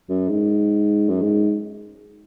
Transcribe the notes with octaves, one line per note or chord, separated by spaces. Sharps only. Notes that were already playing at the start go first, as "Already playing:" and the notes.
F#2
G#2
F#2
G#2